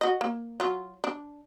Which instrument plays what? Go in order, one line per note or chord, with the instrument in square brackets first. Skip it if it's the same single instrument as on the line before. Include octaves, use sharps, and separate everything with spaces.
[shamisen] F#4 D#5
A#3
F#3 F4
D4